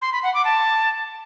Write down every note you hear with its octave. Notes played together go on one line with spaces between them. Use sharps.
C6
B5
F#5
D6
A5